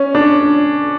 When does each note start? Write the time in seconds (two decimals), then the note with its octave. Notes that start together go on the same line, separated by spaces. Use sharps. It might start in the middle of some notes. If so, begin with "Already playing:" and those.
Already playing: C#4
0.15 D4